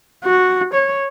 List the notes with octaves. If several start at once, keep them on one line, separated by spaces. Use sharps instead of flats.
F#4
C#5